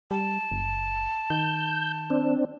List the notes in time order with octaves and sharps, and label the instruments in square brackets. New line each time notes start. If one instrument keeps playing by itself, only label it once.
[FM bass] G3 [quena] A5
[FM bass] F#1
[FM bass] D#3 [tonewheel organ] G6
[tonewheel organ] C4 D4